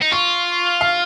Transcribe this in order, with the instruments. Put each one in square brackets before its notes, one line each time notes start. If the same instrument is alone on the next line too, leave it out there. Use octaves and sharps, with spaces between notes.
[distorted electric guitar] D#4
[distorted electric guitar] F4 [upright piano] C#6
[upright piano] F5